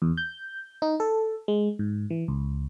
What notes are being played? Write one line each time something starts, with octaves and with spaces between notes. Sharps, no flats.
E2
G6
D#4
A4
G#3
G#2
E3
C#2